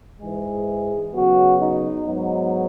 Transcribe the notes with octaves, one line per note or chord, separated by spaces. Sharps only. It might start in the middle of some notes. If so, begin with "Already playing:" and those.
G#2 E3 G#3 G#4
C#3 F#3 B3 F#4
D#4
G#2 F#3 B3 D#4